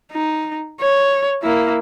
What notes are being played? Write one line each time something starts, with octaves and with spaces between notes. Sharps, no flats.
D#4
C#5
A#3 E4